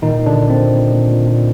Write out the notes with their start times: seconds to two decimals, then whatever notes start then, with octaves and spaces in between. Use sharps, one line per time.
0.02 A#2 D#3 D#4
0.21 A#2
0.26 D3 D4
0.38 A#2
0.50 C4
0.57 A#2
0.74 A#2
0.92 A#2
1.10 A#2
1.27 A#2